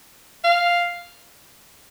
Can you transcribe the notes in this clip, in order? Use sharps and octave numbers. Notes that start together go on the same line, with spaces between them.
F5